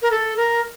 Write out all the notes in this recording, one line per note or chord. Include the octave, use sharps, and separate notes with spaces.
A#4
A4
A#4